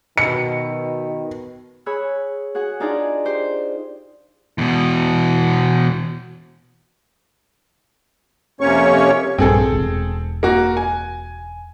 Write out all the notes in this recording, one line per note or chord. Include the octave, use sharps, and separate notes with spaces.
B2 D#3 C#7
G#4 C#5 B5 E6 F#6
F#4 G#4 F#5
D4 D#4 F4 G#4 D5
G4 C5
E2 B2
F2 C3 A#3 C#4 C#5 C#6
A#1 G2 C4 G#4 A4
E1
A#3 F#4
G#5